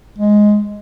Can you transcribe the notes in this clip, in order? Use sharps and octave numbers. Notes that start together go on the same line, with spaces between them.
G#3